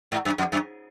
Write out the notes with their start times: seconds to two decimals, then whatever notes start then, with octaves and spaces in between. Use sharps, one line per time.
0.12 G#2
0.25 F#2
0.38 F2
0.52 F#2